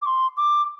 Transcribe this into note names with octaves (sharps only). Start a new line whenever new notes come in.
D6
C6
D6